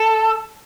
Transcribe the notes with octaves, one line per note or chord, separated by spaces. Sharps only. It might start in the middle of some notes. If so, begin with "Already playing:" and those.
Already playing: A4